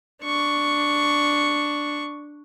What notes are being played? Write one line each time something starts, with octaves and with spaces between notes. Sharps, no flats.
D4 C#6